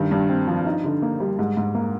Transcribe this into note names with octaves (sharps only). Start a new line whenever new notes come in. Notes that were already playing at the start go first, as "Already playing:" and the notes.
Already playing: G2 D#3
G2
C4
F3
D#4
D3
A#3
G3
G#2
G#2
A#3